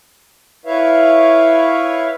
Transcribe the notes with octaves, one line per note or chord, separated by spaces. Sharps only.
E4 B4 C#5 E5 F5